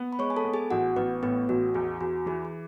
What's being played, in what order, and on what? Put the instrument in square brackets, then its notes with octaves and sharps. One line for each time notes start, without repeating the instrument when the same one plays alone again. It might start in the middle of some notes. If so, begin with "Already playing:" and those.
Already playing: [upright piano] B3
[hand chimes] B5
[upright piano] G#3 [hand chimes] C#5 C#6
[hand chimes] G#5
A4 A5
[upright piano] B3
[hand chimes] G#4 G#5
[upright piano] A1 [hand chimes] F#4 F#5
[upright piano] A1 [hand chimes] B3 B4
[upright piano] A2 [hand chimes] B3 B4
[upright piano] A1 [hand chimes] F#4
[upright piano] E2 [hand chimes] G#4
[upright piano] E2 [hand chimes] F#4
[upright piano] E3 [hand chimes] G#4
[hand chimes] G#4